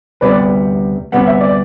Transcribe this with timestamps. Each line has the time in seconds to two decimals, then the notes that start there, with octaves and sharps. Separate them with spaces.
0.21 D2 C3 G3 B3 B4 D5
1.12 D2 C3 G3 B3 F#5
1.26 E5
1.40 D5